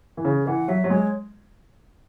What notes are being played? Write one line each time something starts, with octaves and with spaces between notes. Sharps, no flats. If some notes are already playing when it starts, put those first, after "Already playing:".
E3
C#3 G#4
E3 F#5
F#3 E5
F#3
G#3 C#5